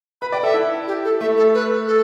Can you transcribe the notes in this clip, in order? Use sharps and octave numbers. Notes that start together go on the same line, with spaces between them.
B4 B5
D5 G5
A4 E5
E4
G4
A4
A3 E5
A4
B4
A4